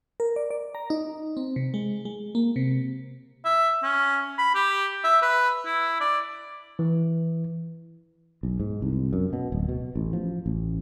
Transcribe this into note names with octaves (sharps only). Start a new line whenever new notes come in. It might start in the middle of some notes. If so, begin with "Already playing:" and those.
A#4
D5
D5
A#5
D#4
C4
C3
G#3
G#3
A#3
C3
E5
C#4
B5
G4
E5
B4
E4
D5
E3
B1
G#2
C2
F#2
B2
D1
B2
A1
F3
A1